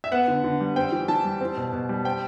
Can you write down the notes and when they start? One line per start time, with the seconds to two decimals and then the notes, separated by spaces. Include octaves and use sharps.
0.04 E5
0.12 B3 F#5
0.28 D3
0.44 D3
0.60 G3
0.76 C4 G5
0.92 E3
1.08 E3 A5
1.25 G3
1.41 C4
1.57 B2
1.73 B2
1.89 G3
2.05 C4 G5